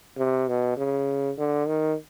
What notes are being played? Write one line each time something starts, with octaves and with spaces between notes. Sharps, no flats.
C3
B2
C#3
D3
D#3